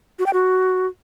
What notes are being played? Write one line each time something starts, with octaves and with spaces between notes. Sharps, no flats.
F#4
G5
F#4